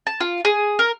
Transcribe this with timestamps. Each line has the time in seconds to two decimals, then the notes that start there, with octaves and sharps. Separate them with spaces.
0.07 A5
0.21 F4
0.45 G#4
0.79 A#4